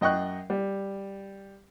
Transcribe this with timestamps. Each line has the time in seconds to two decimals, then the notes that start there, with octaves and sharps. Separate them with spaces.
0.01 F#2 D#5 G5 C#6 F#6
0.50 G3